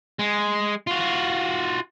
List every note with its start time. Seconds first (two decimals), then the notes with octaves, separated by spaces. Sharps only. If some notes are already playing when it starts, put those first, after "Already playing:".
0.19 G#3
0.87 F4 F#4